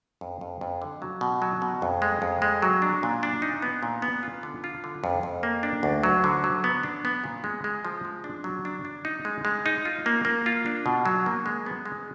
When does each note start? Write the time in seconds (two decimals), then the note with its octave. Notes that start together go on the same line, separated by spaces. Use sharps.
0.21 F2
0.41 F2
0.61 F2
0.82 D3
1.02 F#3
1.21 B2
1.42 F#3
1.62 B2
1.82 F2
2.02 G#3
2.22 F2
2.42 G#3
2.62 F#3
2.82 D4
3.03 A#2
3.23 D4
3.42 D#4
3.62 B3
3.83 A#2
4.02 B3
4.23 F4
4.43 D3
4.64 F4
4.84 D3
5.04 F2
5.23 F2
5.43 A#3
5.63 D4
5.83 D2
6.03 F#3
6.24 D3
6.44 F#3
6.64 B3
6.83 D4
7.05 B3
7.24 A#2
7.44 G#3
7.64 G#3
7.85 F3
8.05 G#3
8.24 D4
8.44 F#3
8.65 D4
8.85 D4
9.05 D#4
9.25 G#3
9.45 G#3
9.66 D#4
9.85 F4
10.06 A#3
10.25 A#3
10.46 F4
10.66 D4
10.86 B2
11.06 F#3
11.26 A#3
11.46 G#3
11.66 B3
11.85 G#3